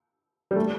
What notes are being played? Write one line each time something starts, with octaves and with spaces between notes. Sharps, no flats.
G3
A3